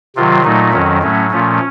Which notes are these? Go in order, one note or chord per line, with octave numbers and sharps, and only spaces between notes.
C3 D#3 F#3 F4
A#2 F#3 A3 D#4
F2 D#3 F#3 C#4
A2 F#3 A3 C#4
A#2 F3 A3 C#4